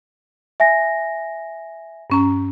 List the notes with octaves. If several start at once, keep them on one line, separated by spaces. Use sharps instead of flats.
E5 G#5 A#6
G2 C#4 A#5